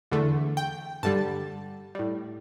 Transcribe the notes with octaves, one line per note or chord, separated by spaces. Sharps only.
E2 D3 A3
G5
G2 D3 G3 A5
A2 G3